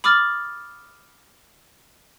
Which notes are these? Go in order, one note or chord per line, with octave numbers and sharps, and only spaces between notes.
B5 D6 D#6 F6 A6